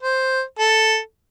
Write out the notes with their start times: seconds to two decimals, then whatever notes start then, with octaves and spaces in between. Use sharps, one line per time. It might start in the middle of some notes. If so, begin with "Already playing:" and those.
0.02 C5
0.59 A4